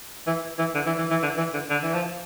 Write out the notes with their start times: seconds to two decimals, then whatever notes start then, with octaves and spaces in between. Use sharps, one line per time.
0.27 E3
0.59 E3
0.75 D3
0.86 E3
0.98 E3
1.10 E3
1.22 D3
1.38 E3
1.54 D3
1.70 D3
1.83 E3
1.94 F3